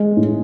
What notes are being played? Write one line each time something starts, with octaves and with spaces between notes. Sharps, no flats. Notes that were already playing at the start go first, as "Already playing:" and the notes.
Already playing: G#3
A2